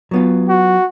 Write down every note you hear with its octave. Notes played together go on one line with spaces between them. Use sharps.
F#3 B3 F4
F#4